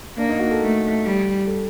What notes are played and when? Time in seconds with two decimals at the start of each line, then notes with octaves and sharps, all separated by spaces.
0.18 A#3 D4
0.29 D#4
0.39 F#4
0.51 A4
0.62 A3
1.05 G3
1.47 A4